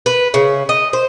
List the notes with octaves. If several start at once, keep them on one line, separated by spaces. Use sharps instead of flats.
B4
C#3
D#5
C5